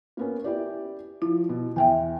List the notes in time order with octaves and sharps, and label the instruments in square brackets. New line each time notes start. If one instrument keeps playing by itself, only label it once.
[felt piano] A#3 B3 C#4
E4 G4 D5
[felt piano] F3 [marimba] E4
[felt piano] B2
[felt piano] E2 [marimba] E5 G5 G#5